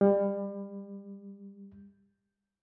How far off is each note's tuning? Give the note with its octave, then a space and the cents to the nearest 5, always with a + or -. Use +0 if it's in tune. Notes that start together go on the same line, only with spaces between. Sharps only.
G3 +30